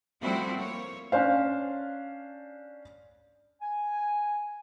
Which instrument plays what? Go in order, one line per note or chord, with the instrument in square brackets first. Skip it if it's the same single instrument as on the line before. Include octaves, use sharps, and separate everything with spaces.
[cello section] F3 G3 A3 C4 E4 F#4
A#3 C#5
[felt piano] C#4 D4 C5 F5
[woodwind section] G#5